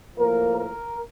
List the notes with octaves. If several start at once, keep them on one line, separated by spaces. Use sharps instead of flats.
A2 F3 A#3 A#4
A#4